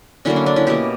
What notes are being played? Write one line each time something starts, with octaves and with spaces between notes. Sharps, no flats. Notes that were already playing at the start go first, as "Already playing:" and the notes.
D3 F#3 A#3 C#4 E4
D4
D4
C#4 E4
B2 A#3 E4 G4